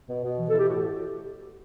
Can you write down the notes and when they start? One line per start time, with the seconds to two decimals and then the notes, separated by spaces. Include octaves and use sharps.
0.09 B2
0.23 B2
0.39 E3
0.49 A4
0.53 E3
0.59 G4
0.69 A2 F#4